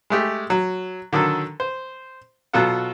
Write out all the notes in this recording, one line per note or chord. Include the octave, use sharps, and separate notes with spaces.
G#3 A3 G4
F#3
D3 D#3 F#3 A4
C5
B2 F#3 F4 A4 F#5